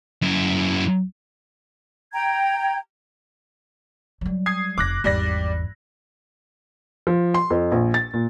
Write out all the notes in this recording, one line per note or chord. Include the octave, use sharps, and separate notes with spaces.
F#2 E4
G5 A#5 G#6
F#3 G3
D#6 G#6 C7
F1 C3 D6 F#6 A#6
G#1 E2 G3 D5 A#6
F3
C6
F2
A#1
A6
A#2